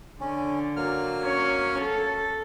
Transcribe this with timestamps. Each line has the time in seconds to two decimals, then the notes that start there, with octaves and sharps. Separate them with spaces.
0.21 D3 C#4
0.76 F#3 A#3 F6
1.23 C#4 C#5
1.81 A4